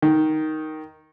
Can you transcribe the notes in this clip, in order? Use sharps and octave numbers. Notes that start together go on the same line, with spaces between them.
D#3